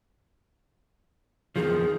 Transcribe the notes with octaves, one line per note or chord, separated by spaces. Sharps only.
E2 D#3 F3 G#4